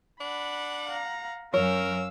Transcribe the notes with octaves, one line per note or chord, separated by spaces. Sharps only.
D4 F#5 B5
F5 A#5
F#2 C#4 A#4 C#5 F5 E6